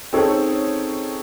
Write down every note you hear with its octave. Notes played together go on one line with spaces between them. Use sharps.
C4 C#4 D#4 G#4 A4 C#5